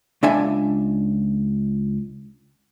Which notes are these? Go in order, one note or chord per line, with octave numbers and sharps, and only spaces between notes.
C#2 D4 E5 G#5